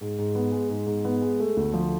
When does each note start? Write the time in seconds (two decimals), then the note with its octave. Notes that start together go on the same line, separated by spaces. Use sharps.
0.01 G#2
0.18 G#2
0.35 B3
0.52 G#3
0.70 G#2
0.87 G#2
1.05 B3
1.22 G#3
1.40 A3
1.57 D2
1.74 F3